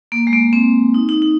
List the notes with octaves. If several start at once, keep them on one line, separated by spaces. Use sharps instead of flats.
A#3
G#3
A#3
C4
D#4
D#4
D#4